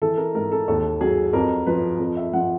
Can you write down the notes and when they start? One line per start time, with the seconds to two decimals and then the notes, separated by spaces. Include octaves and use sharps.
0.02 E3 A4
0.18 A#4
0.34 G#2 A#4
0.52 A4
0.68 D#2 A4
1.01 F#3 G#4
1.33 F2 A#4
1.67 F3 B4
1.99 F2
2.17 E5
2.33 F3 F#5